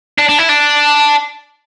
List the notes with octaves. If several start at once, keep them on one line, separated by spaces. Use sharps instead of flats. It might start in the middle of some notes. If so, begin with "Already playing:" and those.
D4
D4
E4
D4